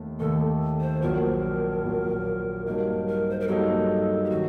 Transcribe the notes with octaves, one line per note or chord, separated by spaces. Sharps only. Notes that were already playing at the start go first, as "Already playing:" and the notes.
Already playing: D#2 D#3 A3
D#2 D#3 A3 A4
C5
A#1 A#2 F#3 A#4
A#1 A#2 F#3
G2 F#3 A#3 D#4 A#4
A#4
C5
A#4
G2 F#3 A#3 D#4 A4
G4
D#3 F#3 F#4